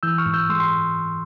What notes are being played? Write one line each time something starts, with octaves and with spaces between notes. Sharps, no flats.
E3 E6 G6
C#6 F6
G#2
E6 G6
G#3 C6 E6
C6